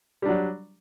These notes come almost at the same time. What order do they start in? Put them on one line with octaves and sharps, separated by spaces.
G3 D4 F#3